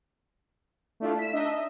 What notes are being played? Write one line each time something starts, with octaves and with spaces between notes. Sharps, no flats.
A3 D4 E4 F4
B6 E7
D4 D#4 D#5 E5
D#5